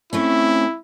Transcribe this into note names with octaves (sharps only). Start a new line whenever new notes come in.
A3 C4 C#4 E4